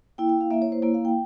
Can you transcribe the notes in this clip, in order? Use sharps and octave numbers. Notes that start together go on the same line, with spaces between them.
A#3 E4 G5
G5
F5
A#3 E4 E5
C#5
C5
A#3 E4 C#5
F5
G5